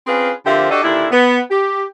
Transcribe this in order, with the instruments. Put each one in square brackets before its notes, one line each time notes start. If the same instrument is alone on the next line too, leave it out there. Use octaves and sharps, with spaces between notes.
[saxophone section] C4 C#4 F4 G#4 B4
D3 F3 A#3 C4 G4 E5
D4 F#4 G4 A4 D5 D#5
D#2 A#2 D3 D4 E4
B3
G4